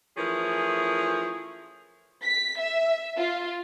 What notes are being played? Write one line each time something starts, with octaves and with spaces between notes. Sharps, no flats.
E3 F3 A3 C#4 G#4 A#4
B6
E5
F4